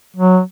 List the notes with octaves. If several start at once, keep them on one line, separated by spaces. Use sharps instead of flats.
F#3